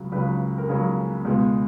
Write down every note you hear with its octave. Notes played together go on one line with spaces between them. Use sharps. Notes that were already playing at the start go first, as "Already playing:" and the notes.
Already playing: C#2 C#3 F#3
C#2 C#3 F#3 B4
A#4
C#2 C#3 F#3 G#4
C#2 B2 G#3 B3